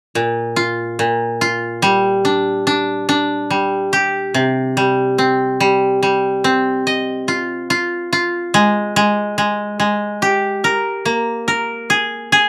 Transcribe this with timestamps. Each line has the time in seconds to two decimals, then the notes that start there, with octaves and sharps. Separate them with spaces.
0.15 A#2
0.56 F4
0.99 A#2
1.41 F4
1.82 G3
2.25 D4
2.67 D4
3.09 D4
3.50 G3
3.93 G4
4.34 C3
4.77 G3
5.18 C4
5.60 G3
6.03 G3
6.44 C4
6.87 D#5
7.28 F4
7.70 F4
8.13 F4
8.54 G#3
8.96 G#3
9.38 G#3
9.80 G#3
10.22 G4
10.64 A#4
11.05 A#3
11.48 A#4
11.90 G#4
12.32 G#4